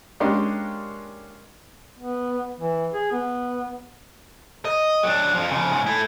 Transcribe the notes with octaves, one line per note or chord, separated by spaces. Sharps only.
G#3 A#3 C#4 D4 G4
B3
E3
G#4
B3
D#5
F#3 D4
F2 F3
C#3 F3
G#2 C#3
A3 E4